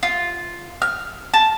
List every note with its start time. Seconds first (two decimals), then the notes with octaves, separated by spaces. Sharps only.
0.03 F4
0.82 F6
1.34 A5